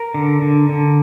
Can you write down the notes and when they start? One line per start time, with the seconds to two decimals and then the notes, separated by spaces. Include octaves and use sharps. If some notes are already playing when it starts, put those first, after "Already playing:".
Already playing: A#4
0.14 D3
0.42 D3
0.69 D3